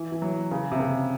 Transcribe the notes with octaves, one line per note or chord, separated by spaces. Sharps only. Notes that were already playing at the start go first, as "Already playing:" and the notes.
Already playing: E3
E3
F#3
C#3
C3
C#3